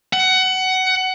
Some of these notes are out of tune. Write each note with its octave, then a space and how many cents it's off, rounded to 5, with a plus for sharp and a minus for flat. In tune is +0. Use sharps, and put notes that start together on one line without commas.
F#5 +20